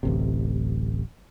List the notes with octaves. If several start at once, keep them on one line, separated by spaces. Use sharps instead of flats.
D1 A1 C3